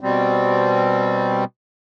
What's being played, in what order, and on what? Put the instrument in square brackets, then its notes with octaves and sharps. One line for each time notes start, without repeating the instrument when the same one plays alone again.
[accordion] B2 G3 C4